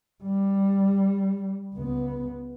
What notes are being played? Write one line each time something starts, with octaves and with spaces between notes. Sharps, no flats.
G3
C#2 B3